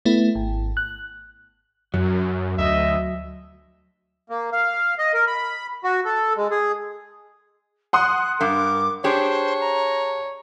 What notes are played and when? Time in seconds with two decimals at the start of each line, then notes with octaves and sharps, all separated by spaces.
0.05 A3 B3 E4
0.35 G#1
0.77 F#6
1.94 F#2 F#3
2.58 D2 D#5 E5
4.30 A#3
4.52 F5
4.99 D#5
5.14 A#4
5.27 B5
5.84 F#4
6.05 A4
6.36 G#3
6.51 G#4
7.93 F#5 C6 D#6 F#6
8.41 G2 A#4 D6
9.04 D4 G4 G#4 C5 C#5
9.60 A#5